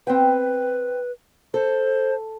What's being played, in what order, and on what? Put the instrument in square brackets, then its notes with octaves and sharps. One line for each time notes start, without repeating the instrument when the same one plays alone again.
[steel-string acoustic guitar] C4 G5 [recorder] B4
[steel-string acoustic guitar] A4 [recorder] C5